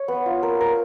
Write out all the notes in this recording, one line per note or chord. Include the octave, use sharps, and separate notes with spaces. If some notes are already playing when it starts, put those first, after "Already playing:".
Already playing: C#5
B3
F4
A#4
A#4